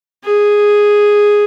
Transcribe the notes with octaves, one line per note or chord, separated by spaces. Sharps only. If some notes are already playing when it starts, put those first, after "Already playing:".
G#4